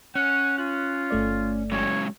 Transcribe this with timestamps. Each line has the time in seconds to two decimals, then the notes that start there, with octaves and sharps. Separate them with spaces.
0.15 C#4 F#5
0.58 F4 F#6
1.11 G1 A3 D5
1.72 F#3 G#3 C#4 C#5